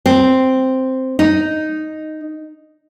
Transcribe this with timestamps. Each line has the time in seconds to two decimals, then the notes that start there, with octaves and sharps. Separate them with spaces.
0.06 C4
1.19 D#4